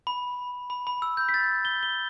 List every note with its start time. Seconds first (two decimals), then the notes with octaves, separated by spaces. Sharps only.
0.07 B5
0.70 B5
0.87 B5
1.02 E6
1.17 G6
1.29 B6
1.34 A6
1.65 G7
1.83 G7